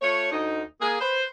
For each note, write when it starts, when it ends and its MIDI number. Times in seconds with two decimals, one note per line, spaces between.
0.02 0.30 57
0.02 0.30 65
0.02 0.30 73
0.32 0.62 38
0.32 0.62 63
0.81 0.97 58
0.81 0.97 68
1.01 1.24 71
1.01 1.24 72